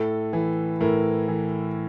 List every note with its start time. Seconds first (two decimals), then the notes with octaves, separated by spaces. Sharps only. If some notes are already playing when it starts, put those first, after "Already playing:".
Already playing: A2 A4
0.33 E3
0.81 A2 A#4
1.28 E3